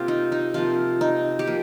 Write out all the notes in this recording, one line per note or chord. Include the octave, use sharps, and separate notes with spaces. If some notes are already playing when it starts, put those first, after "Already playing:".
Already playing: C3 A#3 F4 G4
D#4
D#4
C3 F3 A#3 F4
D#4
G4
F3 A#3